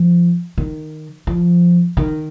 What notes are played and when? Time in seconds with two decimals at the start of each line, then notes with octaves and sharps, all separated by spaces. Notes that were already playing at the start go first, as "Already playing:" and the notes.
Already playing: F3
0.58 D#3
1.27 F3
1.97 D#3